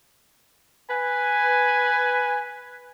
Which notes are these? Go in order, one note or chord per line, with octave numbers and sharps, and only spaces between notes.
B4 G#5